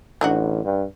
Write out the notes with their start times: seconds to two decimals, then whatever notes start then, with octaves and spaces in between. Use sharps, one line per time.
0.21 A1 D4 D#4 F#4
0.65 G2